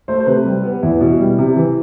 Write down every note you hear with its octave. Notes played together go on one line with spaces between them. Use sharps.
A3 C5
C5
C3 B4
G3
B3
E2 E4
B2
G3
C3
E3